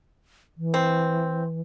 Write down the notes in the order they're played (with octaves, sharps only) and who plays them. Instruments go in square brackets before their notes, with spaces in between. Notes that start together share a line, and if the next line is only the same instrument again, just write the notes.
[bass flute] E3
[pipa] C4